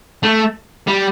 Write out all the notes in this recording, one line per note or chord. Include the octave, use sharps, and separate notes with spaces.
A3
G3